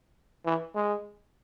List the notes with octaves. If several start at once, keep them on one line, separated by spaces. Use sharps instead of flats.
E3
G#3